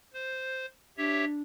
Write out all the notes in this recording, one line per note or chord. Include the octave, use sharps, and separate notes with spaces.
C5
D4 G4 C#5 E5